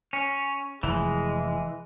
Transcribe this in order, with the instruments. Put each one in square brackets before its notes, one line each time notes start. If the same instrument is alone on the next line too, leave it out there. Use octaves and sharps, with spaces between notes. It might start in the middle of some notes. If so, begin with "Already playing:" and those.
[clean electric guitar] C#4
[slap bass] F1 [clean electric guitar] E3 [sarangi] G#3